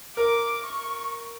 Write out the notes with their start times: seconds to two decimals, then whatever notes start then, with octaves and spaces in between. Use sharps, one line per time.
0.17 A#4 D6
0.66 C#6